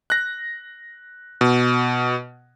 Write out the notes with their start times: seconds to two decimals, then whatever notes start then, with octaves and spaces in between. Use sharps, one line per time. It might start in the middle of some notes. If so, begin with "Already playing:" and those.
0.10 F#6 A#6
1.41 B2